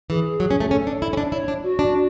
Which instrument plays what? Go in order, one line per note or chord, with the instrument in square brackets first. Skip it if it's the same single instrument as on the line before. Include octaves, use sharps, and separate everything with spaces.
[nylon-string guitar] E3 [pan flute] G#4
[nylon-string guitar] F#3
C#4
A3
[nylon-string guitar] C#4 [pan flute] A4
[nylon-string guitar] D4
E4
C#4
D4
[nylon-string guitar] E4 [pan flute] C#5
[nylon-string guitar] D4
[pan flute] F#4
[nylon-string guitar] D4